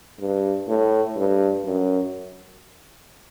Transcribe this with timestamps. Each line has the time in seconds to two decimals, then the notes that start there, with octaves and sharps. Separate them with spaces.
0.20 G2
0.68 A2
1.16 G2
1.65 F#2